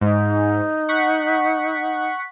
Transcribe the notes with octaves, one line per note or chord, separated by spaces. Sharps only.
G#2 D#4
F#5 C#6 B6